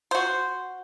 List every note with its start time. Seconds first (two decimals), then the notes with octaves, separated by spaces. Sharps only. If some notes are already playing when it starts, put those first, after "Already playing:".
0.11 F#4 C5